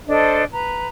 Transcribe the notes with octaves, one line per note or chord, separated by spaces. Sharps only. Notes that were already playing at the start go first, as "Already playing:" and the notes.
D4 A4 C5 D#5
B4 A#5